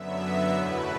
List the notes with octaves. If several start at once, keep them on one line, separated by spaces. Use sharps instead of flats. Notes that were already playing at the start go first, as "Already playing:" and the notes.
Already playing: F#2 D3 F#3 B3 E5
E2 B2 A3 E4 B4